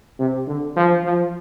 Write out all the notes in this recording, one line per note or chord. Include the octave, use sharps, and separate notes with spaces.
C3
D3
F3
F3